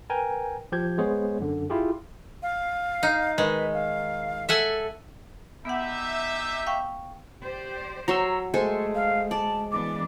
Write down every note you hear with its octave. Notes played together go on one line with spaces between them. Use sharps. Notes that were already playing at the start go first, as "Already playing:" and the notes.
A#4 B4 G5 G#5 A#5
F3 G4 G6 G#6
G#3 B3 G#4 C5 C#5
F#2 D3
E4 F4 G4 G#4
F5
D#4
D#3 G#3 B4
F5
A4 E5 F#5 G#5
B3 D#4 G4 E5 F#5
F5 G5 C#6
G4 C5 D5
F#3 A#5 C6 C#6 E6
G#3 A3 A4 C5 G#5
F5
D5 A5
E3 B3 D4 D6